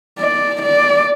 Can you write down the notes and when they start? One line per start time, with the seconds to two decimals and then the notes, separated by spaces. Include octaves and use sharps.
0.19 D5
0.62 D5